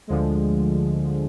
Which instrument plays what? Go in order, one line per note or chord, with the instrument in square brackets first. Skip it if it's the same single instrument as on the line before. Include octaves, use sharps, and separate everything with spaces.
[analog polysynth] D2 D3 F3 G#3